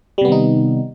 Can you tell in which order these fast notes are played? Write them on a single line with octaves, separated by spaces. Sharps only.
G3 C3 B3 D#3 D#4